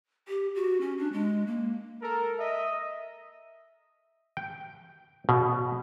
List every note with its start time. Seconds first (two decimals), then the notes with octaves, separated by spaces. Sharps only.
0.28 G4
0.55 F#4
0.81 C#4
0.98 D4
1.13 G#3
1.47 A#3
2.01 A4 A#4
2.38 D#5 E5
4.37 G5
5.29 B2